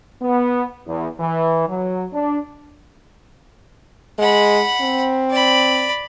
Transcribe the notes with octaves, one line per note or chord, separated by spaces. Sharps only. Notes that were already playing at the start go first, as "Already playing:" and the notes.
B3
E2
E3
F#3
D4
G#3 F#5 B5
C4
D5 B5